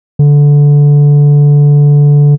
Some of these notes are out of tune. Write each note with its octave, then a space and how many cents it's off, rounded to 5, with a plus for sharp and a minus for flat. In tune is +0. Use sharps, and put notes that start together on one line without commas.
D3 -15